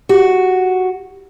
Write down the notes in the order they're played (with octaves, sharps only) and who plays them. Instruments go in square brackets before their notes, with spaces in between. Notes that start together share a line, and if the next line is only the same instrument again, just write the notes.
[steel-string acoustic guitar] F#4 [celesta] G4